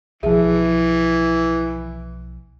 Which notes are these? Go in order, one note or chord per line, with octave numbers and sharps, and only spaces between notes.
B1 E3 F3 G#4 E5